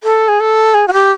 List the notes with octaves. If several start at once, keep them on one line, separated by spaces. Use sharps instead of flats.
A4
G#4
A4
G#4
F#4
G4